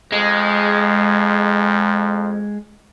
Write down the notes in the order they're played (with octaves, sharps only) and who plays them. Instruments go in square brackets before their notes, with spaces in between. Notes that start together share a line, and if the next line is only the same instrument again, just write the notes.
[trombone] F2 [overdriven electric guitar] G#3